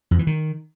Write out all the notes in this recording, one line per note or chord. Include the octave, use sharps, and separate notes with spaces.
F2
E3
D#3